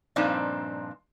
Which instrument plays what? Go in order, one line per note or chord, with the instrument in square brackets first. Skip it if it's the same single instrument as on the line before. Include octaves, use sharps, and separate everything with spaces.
[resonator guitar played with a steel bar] G2 A#2 F3 C4 D4 D#4